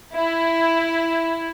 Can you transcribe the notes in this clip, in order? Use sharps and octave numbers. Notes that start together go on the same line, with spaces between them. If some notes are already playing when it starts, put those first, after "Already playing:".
E4